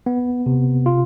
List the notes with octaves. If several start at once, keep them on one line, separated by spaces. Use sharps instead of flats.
B3
C3
F4